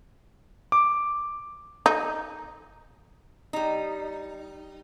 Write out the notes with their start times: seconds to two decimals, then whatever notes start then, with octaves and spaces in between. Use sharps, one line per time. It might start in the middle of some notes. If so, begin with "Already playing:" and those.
0.72 D6
1.86 D#4
3.53 G3 D#4